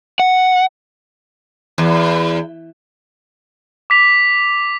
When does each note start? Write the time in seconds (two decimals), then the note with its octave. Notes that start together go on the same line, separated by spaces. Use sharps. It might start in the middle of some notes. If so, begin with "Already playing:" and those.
0.20 F#5
1.78 E2
3.90 D6 B6 F7